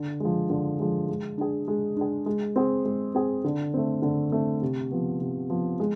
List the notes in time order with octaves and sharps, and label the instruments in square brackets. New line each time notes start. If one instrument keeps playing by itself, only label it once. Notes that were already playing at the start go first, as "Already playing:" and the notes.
Already playing: [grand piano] D3
F3 G#3
D3
F3 G#3
G#3
D4 G#4
G#3
D4 G#4
G#3
C4 G#4
G#3
C4 G#4
D3
A3 C4
D3
A3 C4
C3
F3 B3
C3
F3 B3
G#3